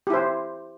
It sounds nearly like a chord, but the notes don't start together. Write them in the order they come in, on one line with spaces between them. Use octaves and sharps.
G4 E4 C5